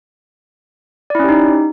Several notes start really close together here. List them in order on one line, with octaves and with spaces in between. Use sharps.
D5 E4 C#4 G4 D#4